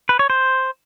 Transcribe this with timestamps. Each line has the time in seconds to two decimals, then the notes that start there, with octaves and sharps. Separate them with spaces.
0.09 B4
0.19 C#5
0.30 C5